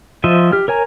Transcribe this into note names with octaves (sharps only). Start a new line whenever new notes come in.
F3 F4 C5 D#5 E5
G4 F6
A#4 C#5 G#5 A#5